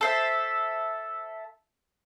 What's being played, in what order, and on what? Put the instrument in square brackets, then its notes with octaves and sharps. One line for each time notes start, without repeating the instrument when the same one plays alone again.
[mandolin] A4 C5 E5